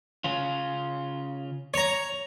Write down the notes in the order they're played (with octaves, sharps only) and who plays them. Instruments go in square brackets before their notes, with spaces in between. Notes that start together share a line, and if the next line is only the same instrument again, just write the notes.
[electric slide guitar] C#3 C#4 F4
[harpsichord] C#5 A#5